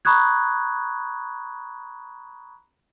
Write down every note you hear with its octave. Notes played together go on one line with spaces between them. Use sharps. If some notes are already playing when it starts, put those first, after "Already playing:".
A#5 B5 C#6 D#6 F#6 G#6